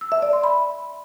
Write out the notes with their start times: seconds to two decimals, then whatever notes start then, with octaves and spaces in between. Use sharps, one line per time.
0.01 E6
0.12 E5
0.22 D5
0.33 C6
0.44 B5